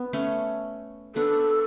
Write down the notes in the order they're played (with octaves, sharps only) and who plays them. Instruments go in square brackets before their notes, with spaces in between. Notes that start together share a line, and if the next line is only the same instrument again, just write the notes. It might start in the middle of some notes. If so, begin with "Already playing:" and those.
Already playing: [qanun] B3
A3 C#4
[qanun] B3 D4 [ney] A4